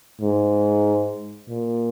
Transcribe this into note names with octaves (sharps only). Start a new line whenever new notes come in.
G#2
A#2